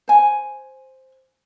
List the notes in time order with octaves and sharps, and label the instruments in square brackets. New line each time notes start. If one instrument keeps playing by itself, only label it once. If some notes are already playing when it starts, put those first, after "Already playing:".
[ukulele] C5 G#5